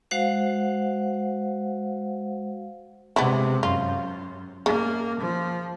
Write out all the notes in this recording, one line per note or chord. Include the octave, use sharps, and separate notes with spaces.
G#3 F#4 C5 F5 F#5
C3 G#3 B3 D4 E4
F#2 F4
C#3 A#3
F3